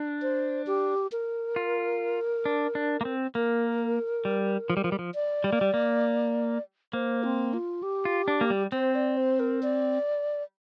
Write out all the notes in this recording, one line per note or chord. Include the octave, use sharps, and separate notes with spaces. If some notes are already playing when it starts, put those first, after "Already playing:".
Already playing: D4
C5
G4
A#4
F4
D4
D4
A#3
C4
A#3 A#4
G3
F3
G3
F3
G3
F3
D5
G3
A#3
G3
A#3
A#3 C5
C4
F4
G4
F4
D4
A#3
G3
C4 C5
D5
C5
A#4
D5